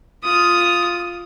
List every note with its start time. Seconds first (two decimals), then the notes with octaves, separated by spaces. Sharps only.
0.24 F4 D#6